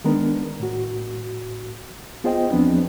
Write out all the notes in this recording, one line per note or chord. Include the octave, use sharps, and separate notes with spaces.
D#3 G#3 B3 D4 A#4
A2 F#4
B3 F4 G#4 C5 D#5 G5
E2 F3 B3 C4 D4